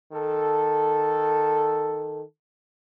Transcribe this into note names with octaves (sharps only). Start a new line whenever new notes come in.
D#3 A4